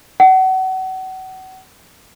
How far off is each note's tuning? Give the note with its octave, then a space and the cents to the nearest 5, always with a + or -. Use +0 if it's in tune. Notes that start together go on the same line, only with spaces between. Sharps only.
F#5 +30